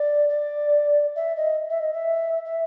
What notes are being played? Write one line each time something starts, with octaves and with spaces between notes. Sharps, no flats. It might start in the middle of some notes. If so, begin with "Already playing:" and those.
Already playing: D5
D5
E5
D#5
E5
D#5
E5
E5